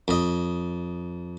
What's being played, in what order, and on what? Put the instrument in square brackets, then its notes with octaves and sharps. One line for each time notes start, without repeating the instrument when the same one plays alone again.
[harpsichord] F2 D#5